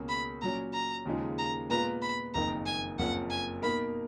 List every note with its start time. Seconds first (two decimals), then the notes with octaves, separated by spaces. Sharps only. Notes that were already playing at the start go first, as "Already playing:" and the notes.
Already playing: C#2 B2 A#3 C#4 G#4
0.09 B5
0.41 A#2 F#3 C#4 A#5
0.73 A#5
1.05 D#2 C#3 F3 G#3 D#4
1.38 A#5
1.69 A#2 G#3 B3 F4 B4 A#5
2.02 B5
2.34 F#1 F2 D#3 A#3 D#4 A#5
2.66 G#5
2.98 F#1 F2 F3 A#3 C#4 F#5
3.30 G#5
3.62 B2 A#3 D#4 A#4 B5